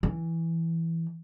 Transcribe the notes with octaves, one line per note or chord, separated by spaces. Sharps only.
E3